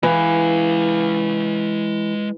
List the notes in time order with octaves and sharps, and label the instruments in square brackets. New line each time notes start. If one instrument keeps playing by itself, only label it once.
[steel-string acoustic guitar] E3 [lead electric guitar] G#3 F5